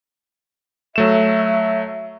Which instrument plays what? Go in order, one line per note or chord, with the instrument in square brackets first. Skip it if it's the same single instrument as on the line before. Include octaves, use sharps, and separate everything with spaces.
[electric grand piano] F#3 A3 E7 [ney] E5